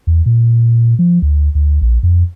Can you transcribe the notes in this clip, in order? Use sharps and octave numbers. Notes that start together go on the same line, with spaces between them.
E2
A#2
F3
D2
D2
A#1
F2